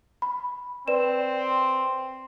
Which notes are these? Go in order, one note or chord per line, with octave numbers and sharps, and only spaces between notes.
B5
C4 B4 D5 E7